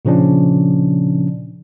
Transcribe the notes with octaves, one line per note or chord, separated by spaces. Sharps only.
A#2 C#3 F3 C#4 D4